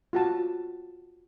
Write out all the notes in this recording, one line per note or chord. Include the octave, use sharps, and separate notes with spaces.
F4 F#4 A5